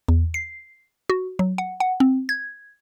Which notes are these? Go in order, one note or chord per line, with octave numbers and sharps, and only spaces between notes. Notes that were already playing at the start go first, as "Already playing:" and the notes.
E2
C7
F#4
F#3
F#5
F#5
C4
G#6